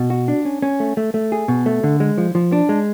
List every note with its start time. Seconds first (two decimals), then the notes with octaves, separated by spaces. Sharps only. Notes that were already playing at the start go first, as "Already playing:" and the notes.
Already playing: B2
0.10 F#4
0.28 D4
0.45 C#4
0.62 C#4
0.80 A3
0.97 A3
1.14 A3
1.32 G#4
1.48 B2
1.66 A3
1.84 D3
2.00 G#3
2.18 F3
2.35 F3
2.52 D4
2.69 G#3